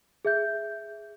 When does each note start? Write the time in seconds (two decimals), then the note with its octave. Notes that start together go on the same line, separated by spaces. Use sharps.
0.25 G#4 E5 G6